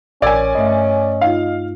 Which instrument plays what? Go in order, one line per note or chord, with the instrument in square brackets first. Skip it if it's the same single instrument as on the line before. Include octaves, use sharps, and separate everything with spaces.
[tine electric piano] A1 [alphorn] C#4 [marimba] A#4 E6 G#6 [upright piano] D5 G#5
[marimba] G2 A3 E5 [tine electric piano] D#5
[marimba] D#4 F4 [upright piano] F5